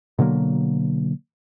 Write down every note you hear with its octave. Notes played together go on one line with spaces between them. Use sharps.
B2 D3 F#3 A#3